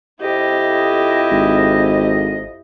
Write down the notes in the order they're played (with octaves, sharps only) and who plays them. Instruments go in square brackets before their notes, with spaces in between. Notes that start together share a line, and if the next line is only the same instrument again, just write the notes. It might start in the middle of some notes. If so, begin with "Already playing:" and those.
[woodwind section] F2 D#5 [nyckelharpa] E4 G4
[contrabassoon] G#1